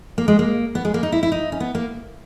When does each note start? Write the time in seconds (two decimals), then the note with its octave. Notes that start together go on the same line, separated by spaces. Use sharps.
0.18 A#3
0.28 G#3
0.39 A#3
0.75 B3
0.85 G#3
0.94 A#3
1.03 D#4
1.12 E4
1.23 E4
1.32 D#4
1.52 C#4
1.60 B3
1.75 A#3